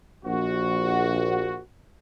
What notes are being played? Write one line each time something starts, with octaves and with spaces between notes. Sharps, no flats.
A#1 F#4